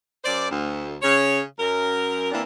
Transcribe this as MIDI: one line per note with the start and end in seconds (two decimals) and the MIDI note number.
0.24 0.47 42
0.24 0.47 72
0.24 0.47 74
0.50 0.95 38
1.02 1.41 49
1.02 1.41 73
1.59 2.30 42
1.59 2.30 70
2.31 2.41 52
2.31 2.41 58
2.31 2.41 60
2.31 2.41 62
2.31 2.41 64